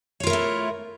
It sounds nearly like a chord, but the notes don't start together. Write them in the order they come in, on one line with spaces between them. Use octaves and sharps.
C#5 F4 A#4 E4 A3